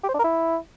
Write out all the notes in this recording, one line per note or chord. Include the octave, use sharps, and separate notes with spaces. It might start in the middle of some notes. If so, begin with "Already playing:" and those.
G4
C5
D4
A#4
E4